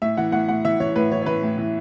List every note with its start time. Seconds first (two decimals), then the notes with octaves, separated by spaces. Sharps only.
0.02 A2 E5
0.17 E3 F#5
0.32 A2 F#5
0.48 A2 F#5
0.65 E3 E5
0.80 E3 C#5
0.96 A2 B4
1.12 E3 C#5
1.22 C#5
1.26 E3 B4
1.43 A2
1.58 E3